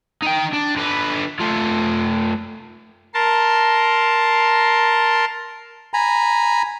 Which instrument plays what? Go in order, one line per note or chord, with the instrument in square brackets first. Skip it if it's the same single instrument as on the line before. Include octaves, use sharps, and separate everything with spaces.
[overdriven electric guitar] D#4 G5
D4
D3 B4
A3 F4
[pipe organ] A#4 A5 C6
[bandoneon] G#5 A#5 B5